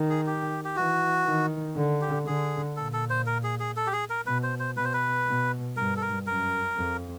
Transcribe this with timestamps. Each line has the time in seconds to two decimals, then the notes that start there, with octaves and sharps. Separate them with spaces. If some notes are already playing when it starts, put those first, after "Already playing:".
Already playing: D#3
0.09 G#4
0.26 G4
0.65 G4
0.76 E3 F#4
1.26 D#3
1.76 D3
2.01 G4
2.26 D3 G#4
2.76 A#2 A4
2.93 A4
3.10 C5
3.26 A#4
3.43 G#4
3.60 G#4
3.76 A4
3.87 G4
3.93 G#4
4.10 A#4
4.26 B2 B4
4.43 C5
4.59 C5
4.77 B2 B4
4.85 C5
4.93 B4
5.27 B2
5.77 G2 A#4
5.96 A4
6.02 A#4
6.26 F#2 A#4
6.76 F2